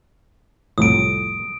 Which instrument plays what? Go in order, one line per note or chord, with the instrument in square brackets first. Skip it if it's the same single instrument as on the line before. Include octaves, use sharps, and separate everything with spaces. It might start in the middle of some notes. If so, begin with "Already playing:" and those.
[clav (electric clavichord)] C2 F2 A2 [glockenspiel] D#6 D7